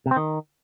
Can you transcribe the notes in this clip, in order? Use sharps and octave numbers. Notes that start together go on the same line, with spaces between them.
C3
C4
D#3